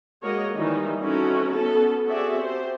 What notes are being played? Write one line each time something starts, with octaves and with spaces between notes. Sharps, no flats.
G#3 A#3 F#4 A#4 C#5 D#5
D#3 E3 G3 D#4
C4 C#4 D#4 E4 F#4 A4
B3 C#4 A4
C4 F#4 G#4 A4 D5 E5
G4 C5